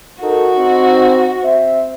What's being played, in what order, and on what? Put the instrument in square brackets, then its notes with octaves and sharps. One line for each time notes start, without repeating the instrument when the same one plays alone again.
[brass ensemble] D#4 A4 A#4 [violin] F#4
[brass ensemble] C4 D#4
C4 C5 E5